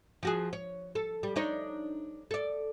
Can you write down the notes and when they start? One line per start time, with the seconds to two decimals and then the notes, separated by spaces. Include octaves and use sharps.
0.23 F3 F#4 G#4
0.53 C#5
0.95 A4
1.23 G3
1.36 D4 D#4 C#5
2.31 A4 D5